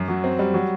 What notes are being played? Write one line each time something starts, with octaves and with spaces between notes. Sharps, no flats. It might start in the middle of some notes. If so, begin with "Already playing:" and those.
Already playing: F#2
F#3
C4
G3
F#3